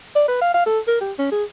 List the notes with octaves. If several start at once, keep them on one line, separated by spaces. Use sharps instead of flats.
D5
B4
F5
F5
A4
A#4
G4
C#4
G#4